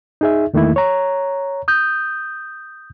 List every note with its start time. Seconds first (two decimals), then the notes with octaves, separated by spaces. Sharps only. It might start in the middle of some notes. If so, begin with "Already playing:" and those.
0.21 D#4 G#4 E5
0.53 E2 D#3 A3 A#3 E4
0.76 C#5 A#5
1.68 D#6 G6